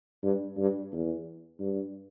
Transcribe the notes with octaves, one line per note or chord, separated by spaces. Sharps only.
G2
G2
E2
G2